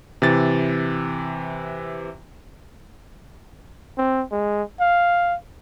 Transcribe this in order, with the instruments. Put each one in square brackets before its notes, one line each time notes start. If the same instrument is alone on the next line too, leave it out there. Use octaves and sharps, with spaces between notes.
[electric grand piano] C3 E3 A6
[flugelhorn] C4
G#3
F5